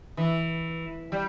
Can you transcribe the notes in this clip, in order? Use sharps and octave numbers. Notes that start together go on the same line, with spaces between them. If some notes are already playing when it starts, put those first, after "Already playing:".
E3
G3